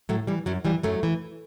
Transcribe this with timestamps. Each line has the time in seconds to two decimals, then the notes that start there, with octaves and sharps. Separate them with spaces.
0.09 A2 F#3 A3
0.27 E3 G3
0.46 F#2 F#3
0.65 E3 G3
0.83 F#2 F#3 A3
1.03 E3